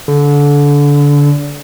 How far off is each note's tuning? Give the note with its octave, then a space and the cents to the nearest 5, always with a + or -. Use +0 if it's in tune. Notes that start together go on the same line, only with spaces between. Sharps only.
D3 -25